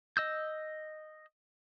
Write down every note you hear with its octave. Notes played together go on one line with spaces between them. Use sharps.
D#5 E6 G6